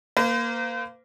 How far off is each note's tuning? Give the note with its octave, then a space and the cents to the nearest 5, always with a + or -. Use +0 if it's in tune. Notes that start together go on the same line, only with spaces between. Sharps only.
A#3 +0 C5 -45